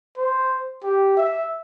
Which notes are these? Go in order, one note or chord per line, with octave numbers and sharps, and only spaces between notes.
C5
G4
E5